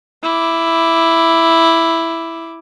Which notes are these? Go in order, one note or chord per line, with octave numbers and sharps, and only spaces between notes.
E4 D6